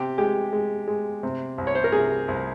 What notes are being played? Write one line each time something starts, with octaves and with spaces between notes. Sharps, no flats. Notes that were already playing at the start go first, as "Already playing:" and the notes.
Already playing: C3 G4
G#3 G4
G#3
G#3
C3
C2
C#5
C5
A#4
C3 G#4
C2